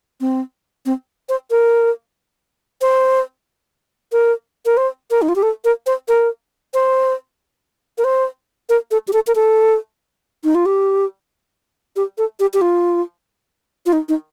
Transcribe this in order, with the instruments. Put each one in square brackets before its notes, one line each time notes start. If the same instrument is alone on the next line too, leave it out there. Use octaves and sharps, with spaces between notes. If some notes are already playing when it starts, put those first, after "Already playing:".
[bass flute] C4
C4
C5
A#4
C5
A#4
A#4
C5
A#4
D#4
F4
G4
A4
A#4
C5
A#4
C5
A#4
C5
A#4
A4
G4
A4
A#4
A4
D#4
F4
G4
G4
A4
G4
G4
F4
F4
D#4
D#4